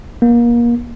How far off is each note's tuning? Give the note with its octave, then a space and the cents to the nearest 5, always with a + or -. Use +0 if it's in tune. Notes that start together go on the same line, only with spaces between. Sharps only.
A#3 +30